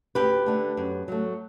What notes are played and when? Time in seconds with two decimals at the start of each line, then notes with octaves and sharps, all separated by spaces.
0.15 D2 G4 B4
0.46 D3 A3
0.77 F#2
1.08 F#3 A3